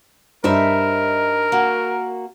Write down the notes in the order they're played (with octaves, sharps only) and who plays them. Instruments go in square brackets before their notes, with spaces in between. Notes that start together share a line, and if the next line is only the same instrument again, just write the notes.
[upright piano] G2 [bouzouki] D#4 C5 E5 [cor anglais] A#4
[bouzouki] A#3 F#4